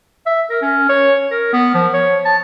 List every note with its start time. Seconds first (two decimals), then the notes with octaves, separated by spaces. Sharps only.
0.26 E5
0.50 A#4
0.62 C#4
0.89 C#5
1.31 A#4
1.53 B3
1.74 F3
1.94 C#5
2.25 A5